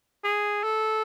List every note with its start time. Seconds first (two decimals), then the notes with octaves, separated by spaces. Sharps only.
0.24 G#4
0.64 A4